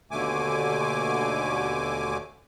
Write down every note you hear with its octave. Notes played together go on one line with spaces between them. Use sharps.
D#2 B2 D3 A3 G#5 D6